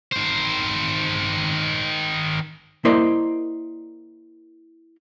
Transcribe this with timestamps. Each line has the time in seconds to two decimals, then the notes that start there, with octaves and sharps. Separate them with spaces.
0.13 D#3 C5
2.85 A#3 E4 A#4 C5 D5 D#5